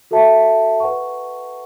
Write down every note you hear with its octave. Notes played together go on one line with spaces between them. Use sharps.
F#4 A4 E5 A5
B4 F#5 C#6